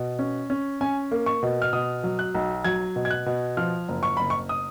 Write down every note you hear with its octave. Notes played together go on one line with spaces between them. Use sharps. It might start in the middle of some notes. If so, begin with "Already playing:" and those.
Already playing: B2
C#4
C#4
C#4 G#5
A#3
C#6
B2
F6
B2 D#6
F#3
F#6
B1
F#3 G#6
B2
G#6
F#6
B2
F3 F6
F#1
C#6
F#1 B5
C#6
D#6